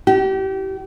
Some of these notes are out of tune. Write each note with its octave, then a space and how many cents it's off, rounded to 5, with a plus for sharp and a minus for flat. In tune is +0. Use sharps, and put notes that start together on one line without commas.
G4 -30